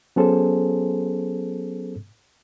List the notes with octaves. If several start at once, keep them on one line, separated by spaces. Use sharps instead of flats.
F#3 B3 C#4 G#4 A4 C5